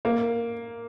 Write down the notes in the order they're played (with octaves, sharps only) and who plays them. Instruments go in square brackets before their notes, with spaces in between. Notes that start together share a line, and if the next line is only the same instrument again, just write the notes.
[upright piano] A#3